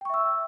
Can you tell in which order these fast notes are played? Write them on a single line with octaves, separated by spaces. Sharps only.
G5 C#6 E5 E6